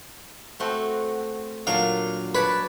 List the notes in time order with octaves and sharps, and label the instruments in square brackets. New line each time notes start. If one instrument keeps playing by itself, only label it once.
[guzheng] A3 C4 F#4
[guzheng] A#2 F#3 D4 [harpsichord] F5
[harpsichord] B4 [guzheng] C#5 D5 A5